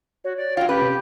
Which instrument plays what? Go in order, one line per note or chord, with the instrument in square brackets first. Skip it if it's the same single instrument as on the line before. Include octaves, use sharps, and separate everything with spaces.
[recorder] F#4 [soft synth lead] C#5
[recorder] D5
[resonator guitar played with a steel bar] F#3 F4 [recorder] G5
[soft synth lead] C#4 [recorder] G4 [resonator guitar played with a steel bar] B4
[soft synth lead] C3